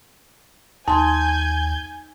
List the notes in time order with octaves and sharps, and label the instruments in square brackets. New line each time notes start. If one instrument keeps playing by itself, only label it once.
[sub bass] D#2 [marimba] D#4 C6 [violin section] G#5 G6 G#6 [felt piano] A5